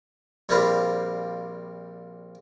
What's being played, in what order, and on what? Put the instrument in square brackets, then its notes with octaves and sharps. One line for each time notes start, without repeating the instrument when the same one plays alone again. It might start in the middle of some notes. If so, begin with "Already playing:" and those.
[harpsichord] A#1 G3 A#3 C4 F4 B4